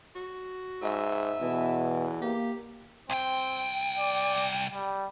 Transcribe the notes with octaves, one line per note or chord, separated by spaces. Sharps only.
F#4
G#2 D#5 E5
E2 B2 E3
A#3 G4
C2 C4 G5
D5
G3